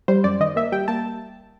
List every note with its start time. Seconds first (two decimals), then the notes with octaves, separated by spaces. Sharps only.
0.08 G3 C5
0.24 F#2 D5
0.40 D#3 D#5
0.56 A#3 E5
0.72 G3 G5
0.88 A#3 A5